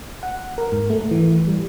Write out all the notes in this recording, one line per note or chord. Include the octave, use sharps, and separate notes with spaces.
F#5
A#4
G#2
A3
E3
G3